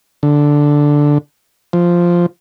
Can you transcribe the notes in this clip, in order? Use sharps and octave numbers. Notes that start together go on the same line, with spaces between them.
D3
F3